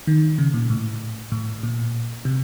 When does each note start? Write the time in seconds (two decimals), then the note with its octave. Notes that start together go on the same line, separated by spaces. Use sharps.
0.07 D#3
0.38 C#3
0.54 A#2
0.70 A2
1.32 A2
1.63 A#2
2.25 C3